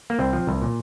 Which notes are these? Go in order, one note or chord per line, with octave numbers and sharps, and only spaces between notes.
A#3
C2 C4
F3
C2
A#2